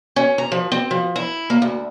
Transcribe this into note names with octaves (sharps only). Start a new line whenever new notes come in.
C#4
A#5
F3
C4
F3
E4
A#3
D2